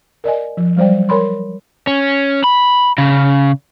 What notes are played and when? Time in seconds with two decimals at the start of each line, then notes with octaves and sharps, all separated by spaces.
0.24 A#4 D5 D#5 G#5
0.57 F3
0.76 F#3 G3 C5 D5 G5
1.09 A#4 C#5 B5 C6
1.87 C#4
2.44 B5
2.98 C#3